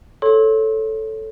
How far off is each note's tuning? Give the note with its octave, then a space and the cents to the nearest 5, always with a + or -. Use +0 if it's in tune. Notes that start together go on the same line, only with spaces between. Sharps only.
A4 +0 C#5 +0 C6 +35